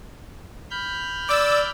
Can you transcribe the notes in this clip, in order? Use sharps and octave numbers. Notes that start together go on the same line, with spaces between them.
B5 F6 G6
D5 D6 E6